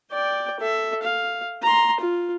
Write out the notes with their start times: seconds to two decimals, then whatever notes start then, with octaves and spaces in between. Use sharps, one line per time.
0.12 D5 G5
0.60 A4 E5
1.02 F5
1.63 A#5 C6
2.01 F4